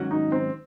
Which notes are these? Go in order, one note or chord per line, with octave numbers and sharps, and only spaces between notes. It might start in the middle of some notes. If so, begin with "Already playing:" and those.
Already playing: G#2 D#3 F#3 C#4 F#4
D#4
C4